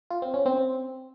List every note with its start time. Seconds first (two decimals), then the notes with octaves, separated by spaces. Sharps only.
0.10 F4
0.22 C4
0.34 C#4
0.46 C4